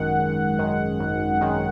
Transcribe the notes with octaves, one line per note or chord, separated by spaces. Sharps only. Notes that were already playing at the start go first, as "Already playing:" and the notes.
Already playing: G#1 F#2 D#3 G#3 F#5
G#1
F#2 D#3 G#3
G#1
F#2 D#3 G#3